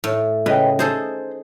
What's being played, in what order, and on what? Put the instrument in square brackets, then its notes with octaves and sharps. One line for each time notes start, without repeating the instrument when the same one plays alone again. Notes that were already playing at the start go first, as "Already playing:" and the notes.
[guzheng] A2
[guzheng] C#3 [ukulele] B4 D#5 G5
[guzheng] D#4 G#4 A4 [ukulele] C5